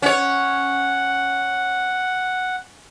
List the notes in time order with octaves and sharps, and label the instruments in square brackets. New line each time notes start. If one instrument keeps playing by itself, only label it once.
[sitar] C#4 C#5 [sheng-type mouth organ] F#5